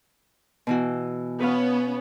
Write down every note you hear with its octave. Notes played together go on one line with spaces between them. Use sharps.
B2 E3 F#4
B3 C#4 B4 C#5 F5